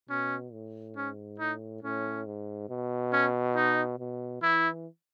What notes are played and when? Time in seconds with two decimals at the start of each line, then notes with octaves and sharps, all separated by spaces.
0.09 B2 C#4
0.53 A2
0.96 G#2 C#4
1.39 A2 D#4
1.82 A2 C#4
2.26 G#2
2.69 B2
3.12 C#4
3.56 D#4
3.99 B2
4.42 E3 E4